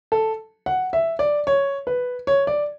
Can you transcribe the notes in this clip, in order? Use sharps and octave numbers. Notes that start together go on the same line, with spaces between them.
A4
F#5
E5
D5
C#5
B4
C#5
D5